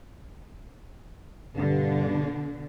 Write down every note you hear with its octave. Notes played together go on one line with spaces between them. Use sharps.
G2 B2 D3 D4